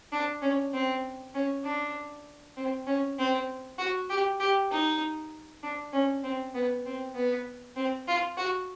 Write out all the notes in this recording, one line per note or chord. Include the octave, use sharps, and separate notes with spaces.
D4
C#4
C4
C#4
D4
C4
C#4
C4
F#4
G4
G4
D#4
D4
C#4
C4
B3
C4
B3
C4
F4
F#4